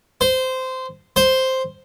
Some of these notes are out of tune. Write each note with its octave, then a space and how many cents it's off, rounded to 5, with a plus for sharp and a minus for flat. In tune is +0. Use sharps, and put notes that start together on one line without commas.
C5 -15
C5 +0